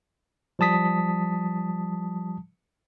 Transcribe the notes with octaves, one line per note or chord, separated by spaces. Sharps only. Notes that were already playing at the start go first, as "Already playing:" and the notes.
F3 G3 A5 D#6 B6